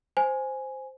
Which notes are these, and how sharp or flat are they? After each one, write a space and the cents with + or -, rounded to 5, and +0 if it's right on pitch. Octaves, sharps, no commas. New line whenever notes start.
C5 +0 G#5 +0